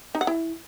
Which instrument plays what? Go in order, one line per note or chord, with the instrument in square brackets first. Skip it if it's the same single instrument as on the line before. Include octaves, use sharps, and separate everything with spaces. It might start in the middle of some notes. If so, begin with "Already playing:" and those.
[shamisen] D#4
F#5
E4